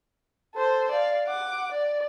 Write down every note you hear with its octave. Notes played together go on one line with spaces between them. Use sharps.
A4 C5
D5 F5
F#5 D6
D5